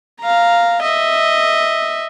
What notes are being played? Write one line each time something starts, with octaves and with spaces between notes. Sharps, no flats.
F5 A#5
D#5 E5